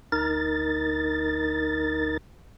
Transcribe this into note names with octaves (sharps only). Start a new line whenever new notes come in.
D2 D#4 A#4 A6